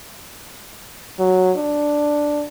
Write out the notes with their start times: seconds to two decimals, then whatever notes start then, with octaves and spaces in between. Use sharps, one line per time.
1.19 F#3
1.57 D4